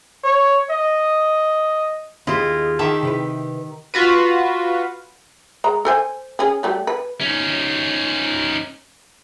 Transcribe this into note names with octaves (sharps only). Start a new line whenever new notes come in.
C#5
D#5
D#2 B3 E4 F4 G4 G#4 D#5
D#3 G4 E5 A5
C3 E4 B4
F4 F#4 B4
G#3 A#5
A4 C5 G#5
C#4 G#4
F#3 G3 A3
B4
C#4 D#4